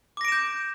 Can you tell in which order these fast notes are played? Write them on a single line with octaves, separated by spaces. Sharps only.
D6 A#6 D7 E7 G6